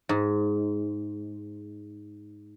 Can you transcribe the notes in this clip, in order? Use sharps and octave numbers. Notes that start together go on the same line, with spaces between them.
G#2